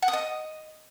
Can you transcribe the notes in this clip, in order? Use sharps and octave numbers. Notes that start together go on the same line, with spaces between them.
F#5
D#6
D#5